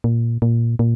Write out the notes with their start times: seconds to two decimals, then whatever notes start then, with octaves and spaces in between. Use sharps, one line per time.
0.04 A#2
0.42 A#2
0.79 A#2